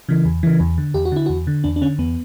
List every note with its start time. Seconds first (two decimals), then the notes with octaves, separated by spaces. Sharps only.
0.09 C#3 E3
0.25 E2
0.43 C#3 E3
0.60 E2
0.78 D3
0.94 E2 G4
1.05 F#4
1.12 D3 E4
1.26 E2 F#4
1.47 D3
1.64 E2 D4
1.76 D4
1.82 D3 C#4
1.98 E2 B3